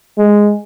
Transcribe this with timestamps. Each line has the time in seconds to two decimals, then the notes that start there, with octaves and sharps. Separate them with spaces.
0.18 G#3